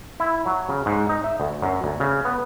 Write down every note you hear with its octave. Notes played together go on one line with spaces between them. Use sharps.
E4
F#3
C#3
G#2
D#4
E5
D2
F#2
D2
C#3
B3